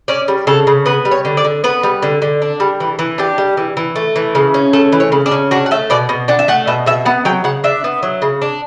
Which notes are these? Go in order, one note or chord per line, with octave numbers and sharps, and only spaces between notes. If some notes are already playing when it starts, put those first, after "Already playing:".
C#4 D5
G3
C#3 A4
C#3
B3 B4
G3
C#5
D3
D5
D3
B3 B4
G3
D3
D3
D4
G3
E3
E3
D4 G4
G3
E3
E3
A3
E3
C#3
C#4
A3 A4
E3
C#5
C#3
D4
C#4
D4 F#4
F#5
A3 E5
B2 D5
B2
D4 F#5
E5
A3 F#5
B2 E5
B2 E5
B3 F#5
F#3 G5
C#3 F#5
D4 E5
B3
F#3
C#3
D4